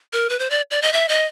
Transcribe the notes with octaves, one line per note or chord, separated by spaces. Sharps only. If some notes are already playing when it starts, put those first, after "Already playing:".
A#4
B4
C5
D5
D5
D#5
E5
D#5